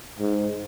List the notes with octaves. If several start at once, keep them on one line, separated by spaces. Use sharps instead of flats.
G#2